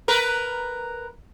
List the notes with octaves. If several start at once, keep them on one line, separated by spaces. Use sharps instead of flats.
A#4 B4